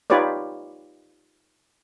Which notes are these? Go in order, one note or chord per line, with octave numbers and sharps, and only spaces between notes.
D#4 F4 G4 B4 C#5 D5